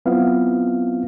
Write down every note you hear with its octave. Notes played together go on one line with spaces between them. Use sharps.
F#3 B3 C4 E4 F4 F5